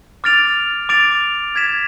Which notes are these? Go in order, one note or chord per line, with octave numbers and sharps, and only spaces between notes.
D6 F6 A6 D7 F7
D6 A6 D7 F7
F6 G#6 B6 E7